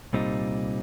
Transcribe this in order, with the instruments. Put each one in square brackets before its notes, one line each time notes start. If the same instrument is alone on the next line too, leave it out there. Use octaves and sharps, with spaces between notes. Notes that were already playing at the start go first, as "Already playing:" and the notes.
[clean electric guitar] C2 A#2 G3 C4 D#4